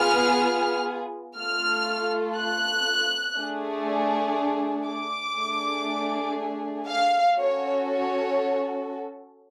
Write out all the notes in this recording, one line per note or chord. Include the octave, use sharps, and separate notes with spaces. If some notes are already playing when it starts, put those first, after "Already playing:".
Already playing: B3 F4 G#4 F6
A3 F4 A4 F6
F#6
A3 D4 G#4
D6
A3 D4 G#4
F5
C#4 F#4 A4 C#5
C#5